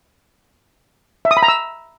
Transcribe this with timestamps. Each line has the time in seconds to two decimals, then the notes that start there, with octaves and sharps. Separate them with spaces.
1.25 E5
1.31 D#6
1.37 B5
1.43 A#5
1.48 E6